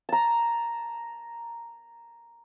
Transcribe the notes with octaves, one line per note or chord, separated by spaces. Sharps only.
A5 A#5